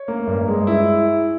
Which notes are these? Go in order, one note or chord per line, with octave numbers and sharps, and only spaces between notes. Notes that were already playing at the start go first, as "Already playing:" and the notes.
Already playing: C#5
A#3
G2
G#3
E4